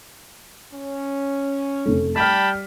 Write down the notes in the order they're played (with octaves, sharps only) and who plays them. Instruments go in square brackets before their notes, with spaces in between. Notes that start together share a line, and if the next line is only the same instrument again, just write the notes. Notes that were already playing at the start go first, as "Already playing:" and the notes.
[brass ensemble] C#4
[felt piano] F1 A3
[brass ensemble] G3 [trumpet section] G5 A5 B5 [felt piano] F6 B6